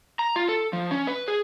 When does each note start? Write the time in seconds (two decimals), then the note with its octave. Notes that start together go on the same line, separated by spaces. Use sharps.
0.19 A#5
0.36 F4
0.49 A4
0.73 F3
0.91 C#4
1.07 B4
1.28 G#4